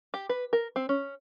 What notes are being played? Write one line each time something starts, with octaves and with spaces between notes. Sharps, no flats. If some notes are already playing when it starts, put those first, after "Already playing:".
G4
B4
A#4
C4
C#4